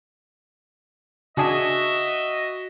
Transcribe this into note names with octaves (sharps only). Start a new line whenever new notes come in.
C#3 D4 F#4 G#4 D#5 E5